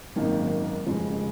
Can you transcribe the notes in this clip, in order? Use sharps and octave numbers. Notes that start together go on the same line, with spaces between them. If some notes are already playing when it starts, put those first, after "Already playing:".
G#1 F#2 D#3 A#3
F1 F2 C#3 F3 G#3